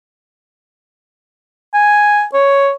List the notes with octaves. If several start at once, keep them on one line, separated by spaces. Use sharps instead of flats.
G#5
C#5